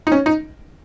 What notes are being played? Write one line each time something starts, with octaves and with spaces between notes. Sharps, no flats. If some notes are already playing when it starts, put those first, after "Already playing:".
D#4
C#4
D#4